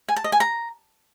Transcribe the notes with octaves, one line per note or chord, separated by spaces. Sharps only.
G#5
A5
D#5
G#5
A#5